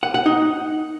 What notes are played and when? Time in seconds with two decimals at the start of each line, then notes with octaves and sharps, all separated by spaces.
0.03 F#5
0.14 F#5
0.26 D#4